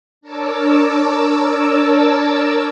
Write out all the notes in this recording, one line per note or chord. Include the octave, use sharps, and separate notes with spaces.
D4 A#4 C#5 A5 D6 E6